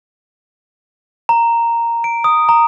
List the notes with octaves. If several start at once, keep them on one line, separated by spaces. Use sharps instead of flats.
A#5
D7
D#6
A#5